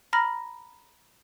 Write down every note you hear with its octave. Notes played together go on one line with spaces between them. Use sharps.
A#5 B5 F6 A#6